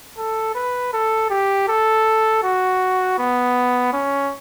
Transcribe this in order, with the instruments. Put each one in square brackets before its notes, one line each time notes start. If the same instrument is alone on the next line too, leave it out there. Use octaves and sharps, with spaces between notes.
[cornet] A4
B4
A4
G4
A4
F#4
B3
C#4